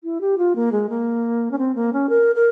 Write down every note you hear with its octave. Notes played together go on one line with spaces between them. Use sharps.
E4
G4
F4
A#3
G#3
A#3
C#4
C4
A#3
C#4
A#4
A#4